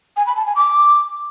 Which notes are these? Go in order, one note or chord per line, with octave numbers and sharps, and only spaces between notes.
G#5
B5
A5
G#5
D6